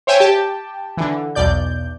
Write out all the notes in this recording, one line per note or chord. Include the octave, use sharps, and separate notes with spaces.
C5 C#5 E5 G5 G#5
G4 G5 A5
D3 E3
B1 E2 B2 D5 G6